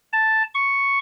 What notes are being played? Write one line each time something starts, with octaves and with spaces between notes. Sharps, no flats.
A5
C#6